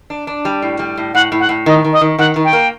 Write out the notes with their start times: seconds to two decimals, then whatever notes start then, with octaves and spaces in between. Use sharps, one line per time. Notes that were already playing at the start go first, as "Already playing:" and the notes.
0.10 D4
0.27 D4
0.45 G3
0.62 A2
0.79 G3
0.97 A2
1.14 A2 F#5
1.32 A2
1.40 F#5
1.49 A2
1.66 D#3 D#5
1.84 D#3
1.93 D#5
2.01 D#3
2.19 D#3 F#5
2.36 D#3
2.44 G5
2.53 A#3